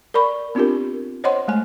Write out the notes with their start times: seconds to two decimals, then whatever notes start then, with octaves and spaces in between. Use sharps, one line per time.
0.14 A#4 D5 B5 C#6
0.55 B3 C4 D4 F4 G4 A#4
1.24 C5 C#5 D#5 F#5 C6
1.48 G#3 A3 G#5